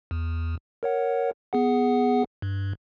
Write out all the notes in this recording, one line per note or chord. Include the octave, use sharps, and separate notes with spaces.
E2
A#4 C#5 F#5
B3 G#4 F#5
G2